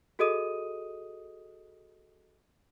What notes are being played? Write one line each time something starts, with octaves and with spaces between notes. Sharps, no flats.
F#4 G#4 A4 D#5 D#6 D#7